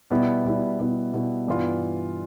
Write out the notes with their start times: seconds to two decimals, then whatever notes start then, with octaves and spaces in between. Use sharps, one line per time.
0.10 B2 G3 B3 E4
0.45 B2 G3 B3 E4
0.79 B2 G3 B3 E4
1.13 B2 G3 B3 E4
1.48 G2 E3 B3 F4